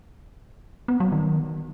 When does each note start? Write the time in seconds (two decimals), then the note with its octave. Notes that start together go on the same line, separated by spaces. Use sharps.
0.88 B3
1.00 F#3
1.12 D#3